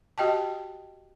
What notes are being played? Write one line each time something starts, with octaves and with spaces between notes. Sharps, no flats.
F#4 G4 D#5 G5 A5